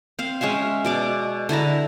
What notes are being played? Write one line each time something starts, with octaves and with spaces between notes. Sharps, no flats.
C4 F5
G#3 C#4 E5 F5
B2 D5 D6
D3 E4 A5 A#5